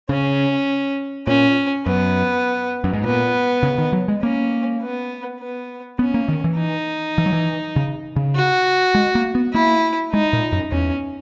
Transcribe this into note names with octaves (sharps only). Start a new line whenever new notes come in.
C#3 C#4
A#2 C#4
F#2 B3
F#2
G#2
A#2 B3
C#3
D#3
F#3
G#3
A#3 C#4
B3
B3
B3 C#4
A#3
D#3
E3
D#4
E3
F#3
E3
C#3
C#3
F#4
G#3
A#3
B3
A#3 E4
G#3 D#4
A#2
F#2
E2 C#4